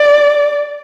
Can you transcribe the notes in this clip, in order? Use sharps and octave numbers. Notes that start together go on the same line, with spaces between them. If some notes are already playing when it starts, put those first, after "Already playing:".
Already playing: D5